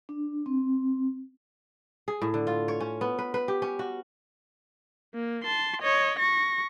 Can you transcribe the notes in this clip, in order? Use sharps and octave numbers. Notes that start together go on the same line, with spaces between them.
D4
C4
G#4
A2
D3
F4
C#5
C#4
B3
B4
B4
G4
C#4
F#4
A#3
A5 C6
C#5 D#5
C#6 A#6